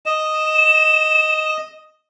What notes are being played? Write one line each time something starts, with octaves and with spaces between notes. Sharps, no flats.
D#5 E7